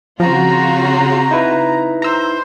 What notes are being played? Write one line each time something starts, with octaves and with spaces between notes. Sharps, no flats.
C#3 F3 C4 F4 F#4 A#5
D#4 E4 B4
C5 A#5 E6